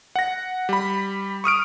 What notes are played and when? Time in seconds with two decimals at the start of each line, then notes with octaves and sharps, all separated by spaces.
0.16 F#5 A#6
0.69 G3 B5
1.44 C#6 D#6 F6 D7